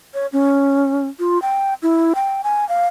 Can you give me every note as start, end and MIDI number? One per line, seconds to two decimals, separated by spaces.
0.14 0.27 73
0.33 1.07 61
1.20 1.41 65
1.42 1.74 79
1.82 2.13 64
2.15 2.42 79
2.44 2.67 80
2.69 2.87 77